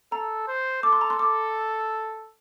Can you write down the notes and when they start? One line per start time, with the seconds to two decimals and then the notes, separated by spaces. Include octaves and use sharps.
0.12 A4 A#5
0.47 C5
0.83 A4 D6
0.93 C6
1.01 A#5
1.10 C6
1.19 A4 D6